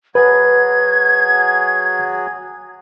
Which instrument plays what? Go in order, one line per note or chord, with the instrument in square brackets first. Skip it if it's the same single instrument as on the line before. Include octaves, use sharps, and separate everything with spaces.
[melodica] F#3 F#4 G#4 [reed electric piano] B4 [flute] G#6